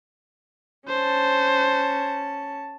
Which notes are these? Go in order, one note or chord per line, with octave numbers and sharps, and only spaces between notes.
C#4 C5 A5